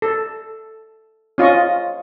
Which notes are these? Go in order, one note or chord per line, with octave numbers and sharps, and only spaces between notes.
A4
C#4 F4 D#5 C#6